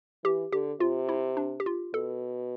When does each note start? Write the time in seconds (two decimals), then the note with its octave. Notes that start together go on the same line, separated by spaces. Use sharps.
0.24 E3 G4
0.52 D3 G4
0.80 C3 F4
1.09 E4
1.37 D4
1.60 G4
1.66 F4
1.94 B2 A4